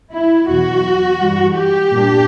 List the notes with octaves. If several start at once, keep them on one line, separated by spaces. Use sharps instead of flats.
E4
E2 B2 F#3 F#4
G2 E3 G3
G4
A#2 G3 A#3 D4